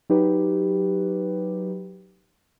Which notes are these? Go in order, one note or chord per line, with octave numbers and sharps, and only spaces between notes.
F#3 D#4 G4 B4